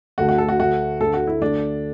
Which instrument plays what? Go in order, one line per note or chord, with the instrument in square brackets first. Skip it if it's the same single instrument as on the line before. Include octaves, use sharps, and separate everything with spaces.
[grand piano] D2 D3 A3 [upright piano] F#4
[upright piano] F#4
A4
F#4
[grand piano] D2 D3 A3 [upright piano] F#4
[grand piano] D2 D3 A3 [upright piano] A4
[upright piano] F#4
E4
[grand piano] D2 D3 A3 [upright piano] D4